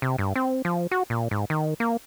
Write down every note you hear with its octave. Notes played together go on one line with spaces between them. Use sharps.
C3
G2
C4
F3
F#4
A#2
G#2
D#3
A#3